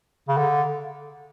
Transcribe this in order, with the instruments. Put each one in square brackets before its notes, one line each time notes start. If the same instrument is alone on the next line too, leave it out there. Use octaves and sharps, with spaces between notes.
[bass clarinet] C#3
D3